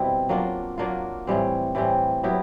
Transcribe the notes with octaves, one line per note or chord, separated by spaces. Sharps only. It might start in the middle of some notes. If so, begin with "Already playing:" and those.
Already playing: B2 G3 C4 E4
F#3 A#3 D4 F4
F#3 A#3 D4 F4
A2 E3 G3 C4
A2 E3 G3 C4
F#3 B3 E4 G4